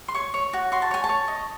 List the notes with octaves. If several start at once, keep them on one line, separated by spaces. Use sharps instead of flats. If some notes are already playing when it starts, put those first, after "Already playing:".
C6
C#5 C#6
C#5
F#4
F#4 C6
A5
C#5 G#5
A5
C#5
D#5